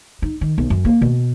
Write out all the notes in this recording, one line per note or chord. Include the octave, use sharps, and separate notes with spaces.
D#4
D#3
B1
F#2
A#3
B2